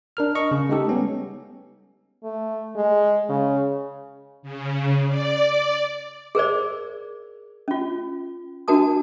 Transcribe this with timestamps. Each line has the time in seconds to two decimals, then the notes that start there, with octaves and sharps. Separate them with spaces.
0.17 D4 A#4 F6
0.35 D#5 C#6
0.51 C#3
0.69 G#3 A3 D#4 G4 A4
0.89 G3 B3 C#4
2.23 A3
2.76 G#3
3.29 C#3
4.43 C#3
5.09 D5
6.35 G#4 A#4 C5 D5
7.68 C#4 F4
8.68 D4 F#4 A#4 A5 D#6